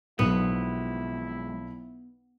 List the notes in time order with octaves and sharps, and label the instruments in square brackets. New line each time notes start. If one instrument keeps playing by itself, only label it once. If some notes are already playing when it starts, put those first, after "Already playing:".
[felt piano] B1 [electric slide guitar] F3 G#3 C4 [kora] B3 [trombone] E4